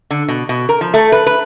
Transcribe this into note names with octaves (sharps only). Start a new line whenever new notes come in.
D3
B2
B2
A#4
F3
A3
B4
B4